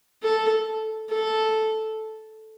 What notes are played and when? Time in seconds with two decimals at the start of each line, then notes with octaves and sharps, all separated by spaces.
0.23 A4
1.10 A4